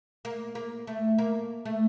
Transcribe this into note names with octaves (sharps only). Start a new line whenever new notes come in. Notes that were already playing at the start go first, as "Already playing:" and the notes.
A#3
A#3
A3
A#3
A3